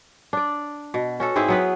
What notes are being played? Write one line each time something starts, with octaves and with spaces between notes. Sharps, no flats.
D4 D5
B2
C#4 F#4 A4
G#2 C4 E4 G#4
F#3 B3 B4